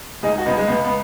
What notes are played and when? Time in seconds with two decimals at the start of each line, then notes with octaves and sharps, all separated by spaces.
0.22 C#2 D#4 G#4
0.38 F#4
0.46 C#2 B3 D#4
0.57 G#3
0.67 C#2 B3
0.84 B3